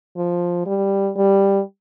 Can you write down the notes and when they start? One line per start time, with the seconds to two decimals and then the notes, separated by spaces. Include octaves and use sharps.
0.17 F3
0.66 G3
1.16 G3